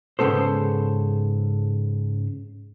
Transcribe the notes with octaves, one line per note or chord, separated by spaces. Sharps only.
G#2 C#3 F3 B3 A4 C5